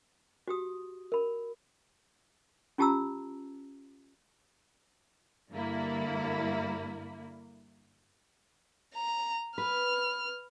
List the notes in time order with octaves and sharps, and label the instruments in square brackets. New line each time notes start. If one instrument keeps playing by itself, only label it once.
[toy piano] F#4 G4 D#6
A#4 B5
C#4 F4 G4 A5 A#5 E6
[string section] G2 D3 A#3 E4
[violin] A#5
[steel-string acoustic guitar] B4 [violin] F6